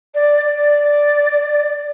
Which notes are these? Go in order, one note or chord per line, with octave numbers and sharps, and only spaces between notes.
D5
D5